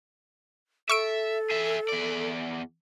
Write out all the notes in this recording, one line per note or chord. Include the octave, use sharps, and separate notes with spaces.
A4 E5 C#6 E6 D7
G#4 E5
E2 D5